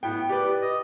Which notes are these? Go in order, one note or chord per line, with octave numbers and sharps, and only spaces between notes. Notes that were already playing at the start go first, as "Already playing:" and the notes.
A2 B3 G5
G4 B4 D5
D#5